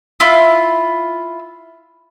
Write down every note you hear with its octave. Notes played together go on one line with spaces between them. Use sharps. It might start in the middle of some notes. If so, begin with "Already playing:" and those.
E4 F4